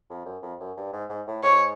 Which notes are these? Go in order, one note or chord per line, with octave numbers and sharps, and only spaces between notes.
F2
F#2
F2
F#2
G2
G#2
G#2
A2
G#2 C#5